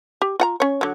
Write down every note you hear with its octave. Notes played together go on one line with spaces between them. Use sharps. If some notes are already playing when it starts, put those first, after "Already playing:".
G4
F4 F#5 A#5
C#4 C#5
D3 F#3